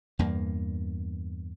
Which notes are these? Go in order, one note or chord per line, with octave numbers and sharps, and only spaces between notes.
E2 G2 A#3